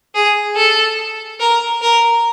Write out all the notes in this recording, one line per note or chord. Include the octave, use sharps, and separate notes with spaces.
G#4
A4
A#4
A#4